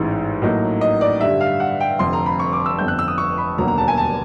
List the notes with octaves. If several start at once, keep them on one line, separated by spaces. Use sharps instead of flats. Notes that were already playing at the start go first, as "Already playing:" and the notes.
Already playing: A1 G#2 E3
A2 F#3 A#3 D#4
D#5
D5
G2 D3 G3 E5
F5
F#5
G5
F1 F2 D3 C6
A#5
B5
C#6
D6
E6
G1 F2 D3 G6
F#6
E6
D#6
C#6
B5
E1 D#2 D3 F#3 A#3 A#5
A#5
A5
G#5
A5